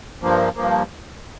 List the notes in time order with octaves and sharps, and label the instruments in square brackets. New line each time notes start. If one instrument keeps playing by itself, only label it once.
[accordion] G2 F3 A#3
G2 F3 A#3